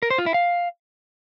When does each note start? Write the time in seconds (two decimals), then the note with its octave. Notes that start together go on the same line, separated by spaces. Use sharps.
0.03 A#4
0.10 C5
0.18 F4
0.26 E4
0.34 F5